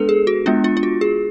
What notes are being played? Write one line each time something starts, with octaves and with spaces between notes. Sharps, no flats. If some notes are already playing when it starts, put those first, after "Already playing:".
Already playing: G#3 B3 D4 A4 B4
G#4
F#4
G#3 B3 D4 F4
F4
F4
F#4
G#4